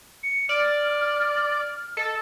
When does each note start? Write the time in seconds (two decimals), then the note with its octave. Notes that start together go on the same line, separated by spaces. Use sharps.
0.23 C#7
0.49 D5 F6
1.97 A4 D#5